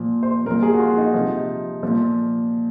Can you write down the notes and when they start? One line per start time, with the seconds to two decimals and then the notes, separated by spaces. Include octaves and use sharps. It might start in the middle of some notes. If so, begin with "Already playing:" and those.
Already playing: A#2 F3
0.23 C5
0.45 A#2 A#4
0.50 F3
0.63 G#4
0.74 F#4
0.80 F4
0.98 D#4
1.14 C3 F3
1.83 A#2 F3